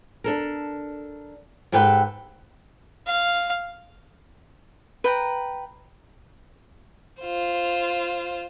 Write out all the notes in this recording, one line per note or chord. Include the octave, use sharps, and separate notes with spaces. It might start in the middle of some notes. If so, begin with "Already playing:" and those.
D4 A4 A#4
G#2 G4 A4 B4 G5
F5
B4 G5 A#5
F4 C5